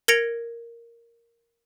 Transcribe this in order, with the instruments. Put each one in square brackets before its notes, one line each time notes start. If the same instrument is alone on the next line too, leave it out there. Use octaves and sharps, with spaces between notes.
[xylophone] A#4 G#6 A#6 C#7 D7 F7